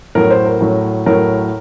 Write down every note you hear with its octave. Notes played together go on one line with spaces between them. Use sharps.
A2 F#3 A#4
C5
A#4
A2 F#3
A2 F#3 A#4